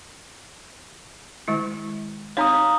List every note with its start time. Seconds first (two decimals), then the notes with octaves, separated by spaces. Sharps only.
1.48 D#3 G#3 E4
2.37 C4 D#4 C#5 F5 A#5 D#6